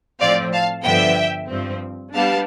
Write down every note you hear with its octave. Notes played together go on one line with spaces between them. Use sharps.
A2 F3 C4 D5 F5
F5 A5
G2 D3 F3 B3 E5 G5
G2 F3 C4
G3 B3 D4 F5 A5